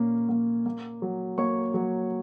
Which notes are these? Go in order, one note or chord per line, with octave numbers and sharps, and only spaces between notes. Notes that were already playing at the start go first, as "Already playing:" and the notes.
Already playing: A#2 A#3 C#4
A#3
A#3
F#3
A#3 C#5 C#6
F#3